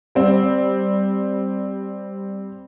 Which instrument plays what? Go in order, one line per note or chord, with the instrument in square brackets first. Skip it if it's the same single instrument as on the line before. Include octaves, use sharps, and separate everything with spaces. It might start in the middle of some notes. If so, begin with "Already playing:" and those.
[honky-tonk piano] G3 C4